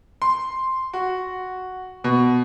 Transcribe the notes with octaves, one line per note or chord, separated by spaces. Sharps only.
C6
F#4
B2